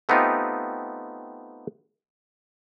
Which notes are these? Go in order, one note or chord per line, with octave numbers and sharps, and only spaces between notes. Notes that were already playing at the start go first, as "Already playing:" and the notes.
A3 B3 C4 D#4 F4 G4